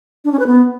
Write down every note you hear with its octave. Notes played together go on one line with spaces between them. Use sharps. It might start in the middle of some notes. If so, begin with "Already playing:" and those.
D4
C#4
B4
B3